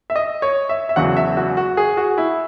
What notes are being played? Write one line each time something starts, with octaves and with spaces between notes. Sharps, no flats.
E5
D#5
C#5
E5
E5
E1 E2 C#3 F#3 F#5
E5
F#4
F#4
G#4
F#4
E4